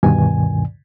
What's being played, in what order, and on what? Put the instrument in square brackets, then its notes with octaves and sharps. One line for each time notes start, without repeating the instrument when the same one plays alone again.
[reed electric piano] D2 G2 B2 D#3 G#5